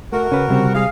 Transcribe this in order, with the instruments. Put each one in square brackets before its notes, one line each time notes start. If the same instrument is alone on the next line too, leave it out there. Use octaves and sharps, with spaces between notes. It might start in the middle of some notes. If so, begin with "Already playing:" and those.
[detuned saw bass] A3 [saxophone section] F#4 A#4
[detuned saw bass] C#3 [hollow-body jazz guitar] C#4 B4
[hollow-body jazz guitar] C3 G3 C4
[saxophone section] G#3 G#4 F5